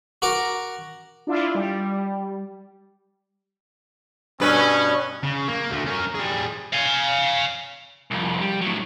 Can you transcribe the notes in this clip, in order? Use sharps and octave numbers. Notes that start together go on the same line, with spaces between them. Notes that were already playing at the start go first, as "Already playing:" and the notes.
F#4 A#4 A#5 D6
D4 E4 F4
G3
G2 B2 C#4 B4
C#3
A#3
D2 A3
C#4 A#4
G3 G#4
F5 G#5
C2 F2
G3
A2 F#3